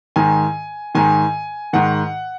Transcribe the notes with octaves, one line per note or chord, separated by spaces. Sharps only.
G#2 D#3 G#5
G#2 D#3 G#5
G#2 D#3 F#5